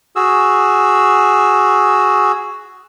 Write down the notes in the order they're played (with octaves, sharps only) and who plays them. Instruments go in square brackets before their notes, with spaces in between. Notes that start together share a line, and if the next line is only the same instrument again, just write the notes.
[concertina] F#4 G#4 E6